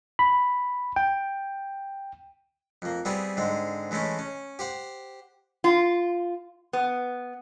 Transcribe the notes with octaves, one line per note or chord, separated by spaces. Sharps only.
B5
G5
F2 A#3
G3 B3 C4 E4 G#4
G#2 D3 G#3 C4
E3 G#3 A3 C#4 E4
C#4
G4 C5 F#5
F4
B3